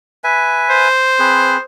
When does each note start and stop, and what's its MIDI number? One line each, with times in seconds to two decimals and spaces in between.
0.24 0.88 71
0.24 0.88 76
0.24 0.88 80
0.70 1.62 72
1.19 1.57 60
1.19 1.57 68
1.19 1.57 71